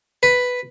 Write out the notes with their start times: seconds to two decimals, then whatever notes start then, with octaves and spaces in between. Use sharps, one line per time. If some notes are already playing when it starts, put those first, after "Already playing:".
0.23 B4